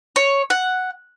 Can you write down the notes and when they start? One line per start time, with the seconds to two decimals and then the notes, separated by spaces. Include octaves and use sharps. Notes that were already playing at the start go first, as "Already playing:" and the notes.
0.16 C#5
0.50 F#5